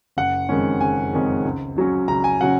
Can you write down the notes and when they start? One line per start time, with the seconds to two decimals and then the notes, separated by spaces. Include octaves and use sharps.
0.17 F#1 F#5
0.49 F2 D#3 G#3 C#4
0.81 F#1 G#5
1.13 F2 D#3 G#3 C#4
1.45 C#2
1.76 C#3 F#3 C#4
2.08 C#2 A#5
2.24 G#5
2.40 C#3 F#3 C#4 F#5